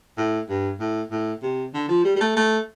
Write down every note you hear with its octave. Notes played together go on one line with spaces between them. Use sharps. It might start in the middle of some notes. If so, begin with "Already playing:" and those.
A2
G2
A2
A2
C3
D3
F3
G3
G3
A3
A3